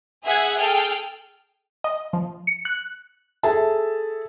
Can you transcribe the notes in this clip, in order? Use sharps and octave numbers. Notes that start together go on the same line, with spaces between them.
G#4 E5 F#5 G#6
G#4 A4 G5 F6
D#5
F3
C#7
F#6
G#4 A4 E5 A5